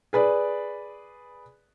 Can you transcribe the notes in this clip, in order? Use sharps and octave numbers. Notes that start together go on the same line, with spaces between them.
G#4 B4 D5